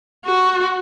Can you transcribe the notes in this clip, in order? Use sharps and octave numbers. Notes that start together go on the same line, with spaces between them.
F#4